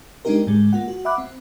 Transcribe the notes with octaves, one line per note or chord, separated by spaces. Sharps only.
G#3 C4 D4 D#4 G4 A#4
G#2 D3 G#3
A#3 F4 F#5
F#4
E5 F#5 B5 D6 F#6
C4